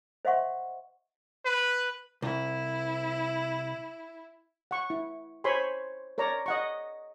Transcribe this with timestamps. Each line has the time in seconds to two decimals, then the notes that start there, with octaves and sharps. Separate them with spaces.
0.25 C5 D#5 E5 F#5 C6 C#6
1.45 B4
2.22 C2 E4
4.71 F#5 C#6
4.90 E4
5.44 C5 C#5 G#5 B5 C6
6.18 A#4 C#5 D5 A#5
6.46 D#5 F#5 C#6